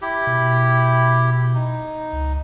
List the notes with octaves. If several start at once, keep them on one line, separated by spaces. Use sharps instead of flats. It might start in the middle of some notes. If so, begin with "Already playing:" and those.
E4 G4
B2
D#4
C#2